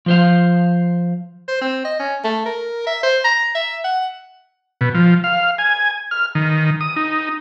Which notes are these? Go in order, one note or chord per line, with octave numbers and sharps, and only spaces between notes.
F3 C5 F5
C5
C4
D#5
C#4
A3
A#4
E5
C5
A#5
E5
F#5
B2
F3
F5
G#5
F6
D#3
D#6
D#4